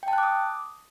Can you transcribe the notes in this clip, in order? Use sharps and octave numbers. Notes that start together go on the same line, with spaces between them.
G5
A5
F#6
D6
D#6